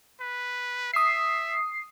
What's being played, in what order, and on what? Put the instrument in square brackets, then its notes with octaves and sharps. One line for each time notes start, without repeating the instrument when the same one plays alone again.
[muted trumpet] B4
[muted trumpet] E5 [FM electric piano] D#6 C7